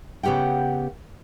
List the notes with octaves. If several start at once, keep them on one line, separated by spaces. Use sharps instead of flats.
C#3 B3 G4 F#5 G5